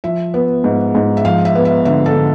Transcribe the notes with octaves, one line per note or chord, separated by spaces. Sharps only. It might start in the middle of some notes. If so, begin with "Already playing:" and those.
F3 E5
B3
G#2
G#2
E5
F3 F5
E5
B3
E5
D3 E5
A4
D3